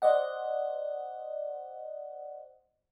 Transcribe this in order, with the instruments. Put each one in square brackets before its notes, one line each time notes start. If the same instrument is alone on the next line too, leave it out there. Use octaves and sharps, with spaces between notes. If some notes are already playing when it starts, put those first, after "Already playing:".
[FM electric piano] C5 D5 D#5 F#5